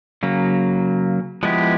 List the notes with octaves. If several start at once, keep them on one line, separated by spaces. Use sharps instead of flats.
C#3 F#3 A#3
F3 G#3 B3 E4 G4